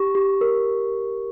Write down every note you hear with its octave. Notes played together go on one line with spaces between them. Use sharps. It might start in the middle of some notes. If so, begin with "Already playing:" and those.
Already playing: G4 C#6
G4
A#4